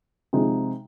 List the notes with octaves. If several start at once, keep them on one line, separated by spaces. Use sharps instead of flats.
C3 F3 G#3 D#4